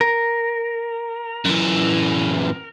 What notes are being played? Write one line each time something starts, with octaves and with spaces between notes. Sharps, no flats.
A#4
F#2 E3